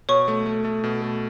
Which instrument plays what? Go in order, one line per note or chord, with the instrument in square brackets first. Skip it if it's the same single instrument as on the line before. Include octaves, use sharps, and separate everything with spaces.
[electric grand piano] B2 [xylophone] C#5 C#6
[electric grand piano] A3
A3
A3
B2
A3